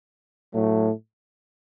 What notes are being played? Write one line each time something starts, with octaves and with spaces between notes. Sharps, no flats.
A2 F#3 A3